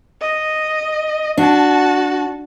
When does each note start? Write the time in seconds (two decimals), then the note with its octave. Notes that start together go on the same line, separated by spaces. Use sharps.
0.21 D#5
1.38 D4 F#4 A5